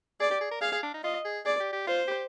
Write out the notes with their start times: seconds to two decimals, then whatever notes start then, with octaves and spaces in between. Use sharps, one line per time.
0.20 G#4 D5
0.31 G4
0.41 G#4
0.51 A#4
0.61 G#4 F5
0.72 G#4
0.83 D4
0.94 D#4
1.03 F4 D#5
1.25 G#4
1.45 G#4 D5
1.60 G4
1.73 G4
1.87 F4 C5
2.08 G4